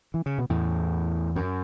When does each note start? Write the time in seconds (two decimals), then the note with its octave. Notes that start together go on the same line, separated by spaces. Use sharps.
0.14 E3
0.26 C#3
0.38 B2
0.50 E2 A2
1.36 F#2